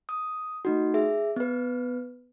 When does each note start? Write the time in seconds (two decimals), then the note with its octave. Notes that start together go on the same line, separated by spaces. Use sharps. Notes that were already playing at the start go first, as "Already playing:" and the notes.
0.09 D#6
0.65 A3 D#4 F#4
0.94 G#4 E5
1.36 B3 B4